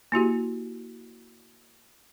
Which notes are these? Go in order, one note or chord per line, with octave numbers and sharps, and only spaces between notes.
A#3 E4 F#4 G4